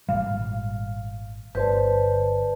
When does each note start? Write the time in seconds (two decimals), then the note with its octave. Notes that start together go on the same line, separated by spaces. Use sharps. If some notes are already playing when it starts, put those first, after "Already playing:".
0.09 G#1 A#2 G3 F5
1.55 G1 B4 C5 D5 A5 G6